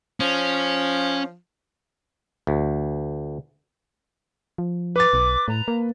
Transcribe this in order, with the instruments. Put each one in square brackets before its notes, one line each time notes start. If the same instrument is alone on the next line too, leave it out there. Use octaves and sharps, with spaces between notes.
[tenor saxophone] F3 [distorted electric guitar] C#4
[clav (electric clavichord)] D2
[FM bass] F3
[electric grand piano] B4 A6 [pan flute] D6
[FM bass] B1
[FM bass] A2 [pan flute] A#5
[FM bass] A#3